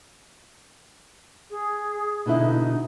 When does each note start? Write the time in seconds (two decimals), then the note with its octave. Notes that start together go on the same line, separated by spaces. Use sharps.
1.50 G#4
2.26 B2 D3 D#4 E4